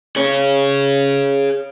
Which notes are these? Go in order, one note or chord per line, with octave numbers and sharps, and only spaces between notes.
G#4 C#5